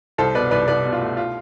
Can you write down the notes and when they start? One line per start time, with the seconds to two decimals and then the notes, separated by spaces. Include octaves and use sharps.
0.18 C2 A4 C5
0.35 B2 B4 D5
0.51 C2 B4 D5
0.68 C2 B4 D5
0.84 B2
0.93 F4
1.01 A3
1.17 F4